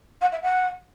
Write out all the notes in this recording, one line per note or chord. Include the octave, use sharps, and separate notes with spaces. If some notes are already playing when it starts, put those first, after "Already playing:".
F#5
E5
F#5